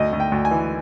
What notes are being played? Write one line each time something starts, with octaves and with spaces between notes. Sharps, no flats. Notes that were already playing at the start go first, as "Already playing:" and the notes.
Already playing: D2 D#5
D2
G5
D2
G#5
E3